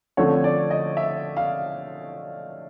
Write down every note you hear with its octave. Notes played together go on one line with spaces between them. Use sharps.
D3 F3 A3 C4 C#5
D5
D#5
E5
F5